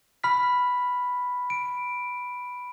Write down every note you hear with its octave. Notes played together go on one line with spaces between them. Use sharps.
B5 F6 B6
D7